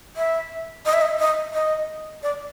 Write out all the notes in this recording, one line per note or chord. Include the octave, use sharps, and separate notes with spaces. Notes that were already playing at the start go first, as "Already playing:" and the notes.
E5
D#5
E5
D#5
D#5
D#5
D5